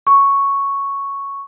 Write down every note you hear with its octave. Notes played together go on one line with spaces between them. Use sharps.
C#6